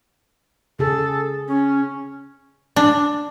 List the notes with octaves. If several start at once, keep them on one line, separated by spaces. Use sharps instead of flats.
C#3 G#4 A4
C#4
D4